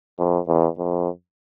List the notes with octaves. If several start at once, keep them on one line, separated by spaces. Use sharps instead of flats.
F2
E2
F2